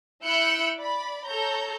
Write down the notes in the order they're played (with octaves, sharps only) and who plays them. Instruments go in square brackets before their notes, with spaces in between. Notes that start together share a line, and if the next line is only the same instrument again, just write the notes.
[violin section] E4 E6 F#6 G6 C#7 D7
D5 B5
A4 C#5 A#5 G6